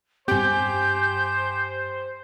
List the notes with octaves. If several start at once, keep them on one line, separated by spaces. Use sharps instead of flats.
G2 C4 G4 C5 G#5 G6